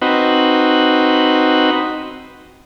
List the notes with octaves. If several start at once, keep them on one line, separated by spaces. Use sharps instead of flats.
C4 D#4 F#4 B4